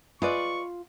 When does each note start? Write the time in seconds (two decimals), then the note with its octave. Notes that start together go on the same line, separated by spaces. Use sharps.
0.22 G#3 F4 B4 D5 C#6